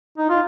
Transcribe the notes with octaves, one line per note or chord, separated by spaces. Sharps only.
D#4
F4